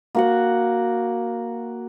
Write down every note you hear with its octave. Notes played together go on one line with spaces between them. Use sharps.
A#3 F#4 F#5